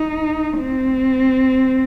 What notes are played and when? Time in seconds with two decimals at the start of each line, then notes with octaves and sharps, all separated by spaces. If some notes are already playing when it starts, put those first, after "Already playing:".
Already playing: D#4
0.58 C4